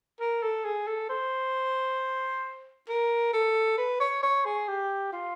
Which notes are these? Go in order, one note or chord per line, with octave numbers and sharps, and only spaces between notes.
A#4
A4
G#4
A4
C5
A#4
A4
B4
C#5
C#5
G#4
G4
F4